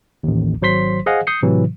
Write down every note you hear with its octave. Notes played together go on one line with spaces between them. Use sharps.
A1 D#2
G#1 F#3 C5 C6 B6
G#4 C5 D#5 F5 F#5 G#5
D#6 G6 C7 C#7
A2 C3 E3 F#3